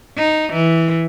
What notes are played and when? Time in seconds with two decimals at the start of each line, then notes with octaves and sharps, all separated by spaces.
0.17 D#4
0.53 E3